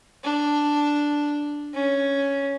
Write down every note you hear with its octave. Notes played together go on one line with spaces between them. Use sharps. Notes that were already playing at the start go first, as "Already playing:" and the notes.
D4
C#4